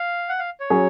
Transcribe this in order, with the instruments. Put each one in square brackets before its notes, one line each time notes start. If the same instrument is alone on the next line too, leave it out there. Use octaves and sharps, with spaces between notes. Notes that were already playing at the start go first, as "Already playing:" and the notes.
Already playing: [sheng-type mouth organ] F5
F#5
F5
C#5
[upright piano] F#3 C#4 G#4